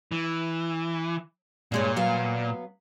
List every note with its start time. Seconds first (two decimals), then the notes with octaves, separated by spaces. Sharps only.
0.12 E3
1.72 G2 A#2 G#3 C#5
1.97 F#3 B3 F5